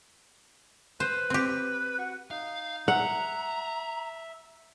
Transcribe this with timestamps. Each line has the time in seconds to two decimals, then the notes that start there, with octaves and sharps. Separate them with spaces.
1.00 B4 C5
1.30 C4 G4
1.98 F#4
2.31 D#4 F5
2.88 E5 F#5 A#5